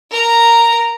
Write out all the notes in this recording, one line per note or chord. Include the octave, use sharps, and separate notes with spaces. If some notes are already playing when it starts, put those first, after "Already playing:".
A#4 A#5